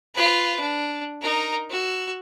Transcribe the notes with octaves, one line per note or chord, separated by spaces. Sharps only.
F4 B4
D4
D#4 A#4
F#4 E6